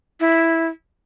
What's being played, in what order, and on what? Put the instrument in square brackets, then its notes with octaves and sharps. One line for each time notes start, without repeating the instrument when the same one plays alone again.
[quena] E4